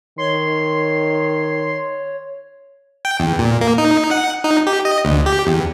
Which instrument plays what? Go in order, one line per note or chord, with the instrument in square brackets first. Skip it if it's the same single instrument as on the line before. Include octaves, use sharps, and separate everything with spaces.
[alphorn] D#3 [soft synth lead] C#5 [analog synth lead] C6
[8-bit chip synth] G5
E2
A#2
A#3
D#4
F#5
D#4
G4
D#5
D2
G4
E2